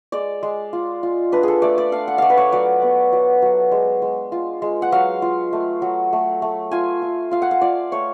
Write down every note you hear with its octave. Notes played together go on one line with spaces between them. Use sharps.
G#3 D5
G#3
F4
F4
D4 B4
G#4 A4
A3 D5
D5
D4 F5
F#5
A3 D5 F5
B4
C#5
F#3 D5
B3
F#3
F#3
G#3
G#3
F4
G#3
F#5
F#3 F5
F4
A3
F#3
A3
A3
F4 G#5
F4
F4 F5
F#5
F5
F4 D5
A3 C#5